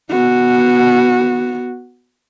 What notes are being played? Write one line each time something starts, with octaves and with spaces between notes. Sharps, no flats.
B3 F#4